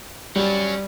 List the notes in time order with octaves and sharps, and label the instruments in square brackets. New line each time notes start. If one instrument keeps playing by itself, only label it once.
[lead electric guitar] F#3 C#4 [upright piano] G3